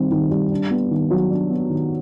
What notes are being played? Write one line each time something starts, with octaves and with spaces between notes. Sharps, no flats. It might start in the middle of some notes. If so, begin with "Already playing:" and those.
Already playing: D#3 G3 C4
D#3
G3
D4
B3
D#3
F#3
D4
B3
D#3